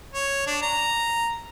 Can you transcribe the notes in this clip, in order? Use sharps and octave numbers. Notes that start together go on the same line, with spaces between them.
C#5
D4
A#5